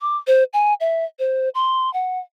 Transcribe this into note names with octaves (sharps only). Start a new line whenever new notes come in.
D6
C5
G#5
E5
C5
C6
F#5